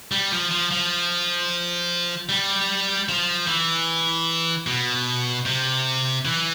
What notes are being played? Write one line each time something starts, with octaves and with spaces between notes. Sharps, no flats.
G3
F3
F3
F3
G3
F3
E3
B2
C3
E3